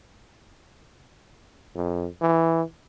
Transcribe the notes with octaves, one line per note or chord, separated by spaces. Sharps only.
F2
E3